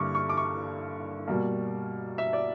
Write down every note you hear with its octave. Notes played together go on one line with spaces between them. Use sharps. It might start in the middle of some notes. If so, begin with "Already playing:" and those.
Already playing: G2 D3 G3 A#3 C#6 D6
C#6
D6
C#6
B2 G3 A#3
E5
D5